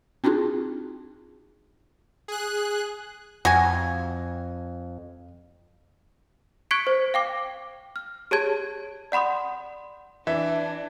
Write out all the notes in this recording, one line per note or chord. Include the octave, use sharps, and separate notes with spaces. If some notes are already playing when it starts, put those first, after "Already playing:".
C4 D4 D#4 F4 F#4 G#4
G#4 F#6
F2 F#4 G#5
C#6 F#6 G#6 B6 C#7 D7
C5
F5 G5 D6
F6
G4 G#4 C#5 A5 G#6
D5 F#5 B5 C6 D#6
E3 D4 E5